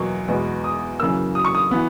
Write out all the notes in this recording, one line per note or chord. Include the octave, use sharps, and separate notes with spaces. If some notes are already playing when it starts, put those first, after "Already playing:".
Already playing: E2 B2 F#3 A#3 C#6
E2 B2 G#3 B3
D#6
F#2 C#3 E3 A#3 E6
D#6
C#6
D#6
E3 B3